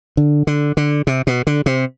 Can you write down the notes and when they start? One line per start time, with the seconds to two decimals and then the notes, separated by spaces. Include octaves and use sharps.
0.17 D3
0.47 D3
0.77 D3
1.07 C3
1.27 B2
1.47 D3
1.66 C3